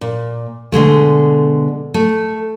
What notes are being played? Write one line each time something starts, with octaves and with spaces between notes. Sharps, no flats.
A#2
B2 D3 G#3 A3
A3